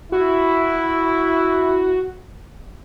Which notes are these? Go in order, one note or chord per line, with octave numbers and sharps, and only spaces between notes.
E4 F#4